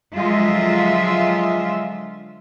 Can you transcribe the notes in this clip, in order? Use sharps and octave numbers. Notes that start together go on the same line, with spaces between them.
D3 F3 F#3 G#3 F4 E5